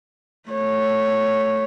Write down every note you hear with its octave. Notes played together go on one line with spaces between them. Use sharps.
A3 C#5